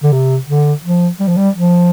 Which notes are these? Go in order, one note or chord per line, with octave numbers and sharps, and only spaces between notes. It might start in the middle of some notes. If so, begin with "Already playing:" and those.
D3
C3
D3
F3
G3
F3
G3
F3